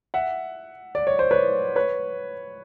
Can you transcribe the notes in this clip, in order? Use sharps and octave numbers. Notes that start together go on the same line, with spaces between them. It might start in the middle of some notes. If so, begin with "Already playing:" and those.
E5 F#5
D5
C#5
C5
B4 C#5
B4 C#5